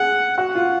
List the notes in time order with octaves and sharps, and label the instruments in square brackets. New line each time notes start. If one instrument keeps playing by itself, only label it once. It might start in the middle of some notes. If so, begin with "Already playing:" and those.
Already playing: [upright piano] G#4 [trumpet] F#5
[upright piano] F#4 [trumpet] F#5
[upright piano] F4